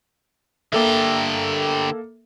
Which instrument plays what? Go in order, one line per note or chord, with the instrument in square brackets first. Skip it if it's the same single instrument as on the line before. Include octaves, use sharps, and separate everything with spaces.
[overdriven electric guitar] D3 G4 [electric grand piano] A#3 A4 E5